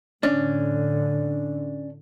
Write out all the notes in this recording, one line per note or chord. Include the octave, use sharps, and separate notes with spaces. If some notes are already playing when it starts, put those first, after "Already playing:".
A2 D3 C#4 D4